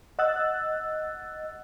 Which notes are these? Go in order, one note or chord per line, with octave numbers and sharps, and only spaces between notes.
D#5 F#5 E6 F#6 A6